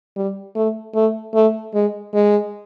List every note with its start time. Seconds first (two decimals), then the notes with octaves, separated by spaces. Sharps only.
0.16 G3
0.55 A3
0.94 A3
1.34 A3
1.74 G#3
2.13 G#3